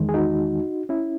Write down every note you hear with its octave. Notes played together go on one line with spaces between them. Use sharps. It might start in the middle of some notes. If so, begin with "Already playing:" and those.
Already playing: E2 D#3 G#3
G#4
D#4 F#4
C#4 E4